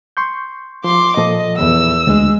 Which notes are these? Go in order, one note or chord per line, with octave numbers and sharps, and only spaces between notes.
C6 C#6 G6
F3 C6 D6
A#2 F3 A4 D#5
E2 E6
D2 G#3